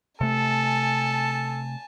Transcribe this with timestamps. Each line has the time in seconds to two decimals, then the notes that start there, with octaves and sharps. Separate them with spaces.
0.21 C3 A3 A4 G#5 A5